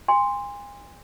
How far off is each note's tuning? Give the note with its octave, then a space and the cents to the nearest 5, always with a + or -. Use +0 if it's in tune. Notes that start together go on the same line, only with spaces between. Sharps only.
G#5 -35 C6 +0